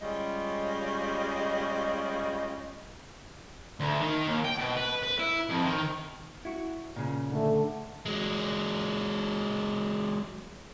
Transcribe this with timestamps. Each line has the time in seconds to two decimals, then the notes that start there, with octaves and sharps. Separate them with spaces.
0.02 G3 G#3 C#4 F4 D#5
3.80 D2
4.00 D#3
4.27 D#2
4.45 G5
4.59 B2
4.77 B4
5.03 B4
5.19 E4
5.49 F2
5.65 D#3
6.45 E4 F#4
6.96 A#2 C#3
7.32 D3 A3
8.06 F#3 G#3